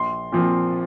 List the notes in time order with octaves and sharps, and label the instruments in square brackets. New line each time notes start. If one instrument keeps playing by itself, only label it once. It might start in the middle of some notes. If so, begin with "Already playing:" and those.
Already playing: [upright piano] A#1 C6
A#2 F3 C4